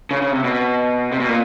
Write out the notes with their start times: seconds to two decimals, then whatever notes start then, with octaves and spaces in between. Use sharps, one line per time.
0.11 C#3
0.22 C#3
0.32 C3
0.44 B2
1.12 C3
1.20 B2
1.28 A#2